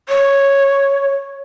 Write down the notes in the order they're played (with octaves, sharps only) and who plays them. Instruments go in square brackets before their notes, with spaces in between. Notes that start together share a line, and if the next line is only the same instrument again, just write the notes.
[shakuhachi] C#5